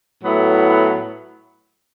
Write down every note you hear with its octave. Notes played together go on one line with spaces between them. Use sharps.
A2 F#3 B3 E4